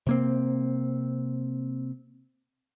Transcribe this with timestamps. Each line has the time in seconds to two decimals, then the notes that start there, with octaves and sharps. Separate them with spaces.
0.07 C3 A#3 C4